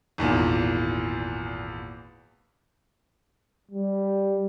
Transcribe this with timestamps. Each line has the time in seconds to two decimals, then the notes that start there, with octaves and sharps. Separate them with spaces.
0.18 G#1 E2 A#2
3.71 G3